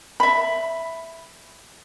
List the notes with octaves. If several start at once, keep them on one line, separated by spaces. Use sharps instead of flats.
E5 B5